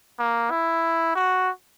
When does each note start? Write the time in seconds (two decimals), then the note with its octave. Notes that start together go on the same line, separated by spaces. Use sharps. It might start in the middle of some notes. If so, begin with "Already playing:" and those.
0.19 A#3
0.51 E4
1.15 F#4